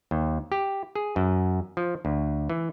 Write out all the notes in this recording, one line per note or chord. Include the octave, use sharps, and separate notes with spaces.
D#2
G4
G#4
F#2
F3
D2
E3